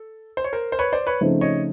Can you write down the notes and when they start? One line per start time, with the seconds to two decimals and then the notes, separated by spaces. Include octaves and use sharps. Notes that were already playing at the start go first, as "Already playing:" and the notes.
Already playing: A4
0.37 C5
0.44 C#5
0.53 A#4 C5
0.72 C5
0.79 B4 C#5
0.93 C5 D5
1.07 B4 C#5
1.21 C#3 F3 A3 C4 D#4
1.41 C#5 D#5